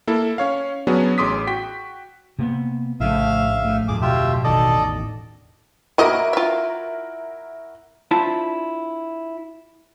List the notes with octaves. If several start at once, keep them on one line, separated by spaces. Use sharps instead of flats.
A#3 E4 A4
C#4 C#5 F5
F#3 B3 C#4 D4 F#4 G#4
A1 G#4 C6 D6 D#6 B6
F#4 G5 B6
C3 A#3 B3
A#1 A2 C#3 A3 E5 F5
A2
D1 F2 G#4 D6
B2 F4 G4 E5
E1 A1 D#3 A4 D5 D#5
A#3 E4 F#4 A#4 D#5
F4 E5
D4 E4 F4 C5 E5 A5